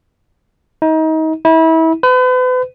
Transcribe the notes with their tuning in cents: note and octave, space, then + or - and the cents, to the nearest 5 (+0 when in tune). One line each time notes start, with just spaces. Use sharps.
D#4 +30
E4 -30
B4 +40